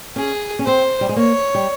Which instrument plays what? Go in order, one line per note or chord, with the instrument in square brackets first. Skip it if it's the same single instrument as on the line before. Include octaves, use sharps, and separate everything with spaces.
[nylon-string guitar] C#4 [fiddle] G#4
[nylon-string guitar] C#4
[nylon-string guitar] C4 [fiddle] C5
[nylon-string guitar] G3
G#3
[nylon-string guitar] A#3 [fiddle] C#5
[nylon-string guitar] G3